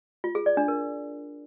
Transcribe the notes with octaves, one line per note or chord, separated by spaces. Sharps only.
F4
G#4
D5
D4
A#4